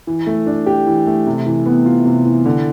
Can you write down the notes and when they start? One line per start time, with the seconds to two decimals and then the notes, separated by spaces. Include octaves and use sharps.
0.07 E3
0.27 A3
0.46 D4
0.66 G4
0.87 E3
1.07 A3
1.26 C3
1.46 E3
1.66 B3
1.86 F4
2.05 C3
2.25 E3
2.45 D3